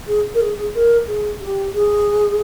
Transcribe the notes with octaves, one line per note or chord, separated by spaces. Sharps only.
G#4
A#4
G#4
G#4
A#4
G#4
G4
G#4